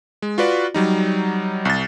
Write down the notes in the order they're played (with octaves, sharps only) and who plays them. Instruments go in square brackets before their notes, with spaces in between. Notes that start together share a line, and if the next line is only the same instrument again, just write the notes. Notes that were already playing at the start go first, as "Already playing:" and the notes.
[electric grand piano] G#3
F4 F#4 B4 D5
F#3 G3 D#4
C2 A6